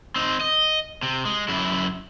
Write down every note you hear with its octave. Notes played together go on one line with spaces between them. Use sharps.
C4 D#4
D#5
C3
G#3
F#2 E4